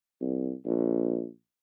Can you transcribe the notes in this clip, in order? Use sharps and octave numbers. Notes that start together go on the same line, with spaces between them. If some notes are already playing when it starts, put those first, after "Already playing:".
C2
A#1